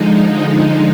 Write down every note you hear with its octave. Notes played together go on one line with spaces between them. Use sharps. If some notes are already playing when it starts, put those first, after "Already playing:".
Already playing: D3 F3 G#3 D#4
D#4